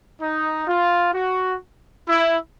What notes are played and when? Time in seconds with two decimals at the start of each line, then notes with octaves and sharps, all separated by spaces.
0.21 D#4
0.67 F4
1.14 F#4
2.08 E4